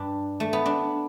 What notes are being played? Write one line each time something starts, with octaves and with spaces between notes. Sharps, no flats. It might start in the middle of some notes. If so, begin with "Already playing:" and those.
Already playing: G2 G3 D4
A3
B3
D4